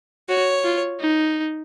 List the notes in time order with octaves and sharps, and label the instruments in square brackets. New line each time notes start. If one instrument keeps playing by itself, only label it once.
[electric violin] F#4 [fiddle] C#5
[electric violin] F4
D#4